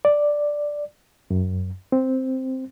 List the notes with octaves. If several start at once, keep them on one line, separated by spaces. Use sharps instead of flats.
D5
F#2
C4